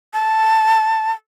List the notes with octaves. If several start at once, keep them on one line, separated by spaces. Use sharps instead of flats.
A5